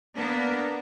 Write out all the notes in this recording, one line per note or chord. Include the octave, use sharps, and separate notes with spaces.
A#3 B3 D4 A#4